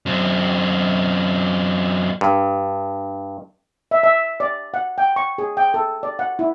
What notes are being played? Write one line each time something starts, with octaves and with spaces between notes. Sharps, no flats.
F#2 C4
G2
E5
E5
D5
F#5
G5
C#6
G#4
G5
A4
D5
F#5
E4